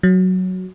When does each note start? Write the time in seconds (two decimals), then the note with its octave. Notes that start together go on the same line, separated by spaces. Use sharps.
0.03 F#3